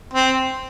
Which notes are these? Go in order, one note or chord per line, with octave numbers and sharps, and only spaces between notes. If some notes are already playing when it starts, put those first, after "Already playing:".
C4